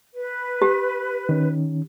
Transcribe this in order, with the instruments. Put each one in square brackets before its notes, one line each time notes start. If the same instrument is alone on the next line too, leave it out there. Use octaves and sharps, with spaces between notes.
[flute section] B4
[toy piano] G4
[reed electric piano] D#3 C#4